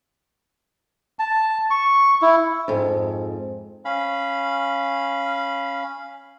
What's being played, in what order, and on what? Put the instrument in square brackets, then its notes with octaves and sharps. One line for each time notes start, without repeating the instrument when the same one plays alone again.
[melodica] A5
C#6
E4
[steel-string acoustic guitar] F2 G#2
[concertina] C#4 F5 B5